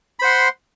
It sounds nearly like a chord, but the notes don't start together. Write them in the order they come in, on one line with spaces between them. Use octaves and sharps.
B5 C5 F#5 C6